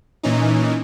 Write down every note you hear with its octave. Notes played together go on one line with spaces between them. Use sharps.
A#2 E3 C#4 D#4